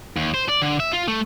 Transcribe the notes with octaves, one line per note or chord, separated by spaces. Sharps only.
D#2
C5
D5
D3
E5
F4
A3